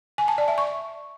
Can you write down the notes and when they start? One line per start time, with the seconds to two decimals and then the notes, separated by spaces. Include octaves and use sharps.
0.18 G#5
0.28 A5
0.38 D5
0.48 E5
0.58 C#6